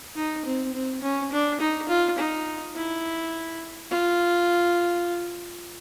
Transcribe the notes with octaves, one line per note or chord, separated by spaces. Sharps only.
D#4
C4
C4
C#4
D4
D#4
F4
D#4
E4
F4